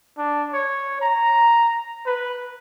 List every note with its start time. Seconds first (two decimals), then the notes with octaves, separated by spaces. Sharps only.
0.18 D4
0.53 C#5
1.01 A#5
2.06 B4